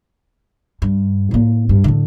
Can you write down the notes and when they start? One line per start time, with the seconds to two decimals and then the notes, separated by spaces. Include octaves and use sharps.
0.82 G2
1.31 A2 A#3
1.69 G2
1.84 A2 D3